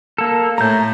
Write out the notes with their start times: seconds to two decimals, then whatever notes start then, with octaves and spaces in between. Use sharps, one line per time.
0.18 A#3 A4
0.58 A2 A#5 G6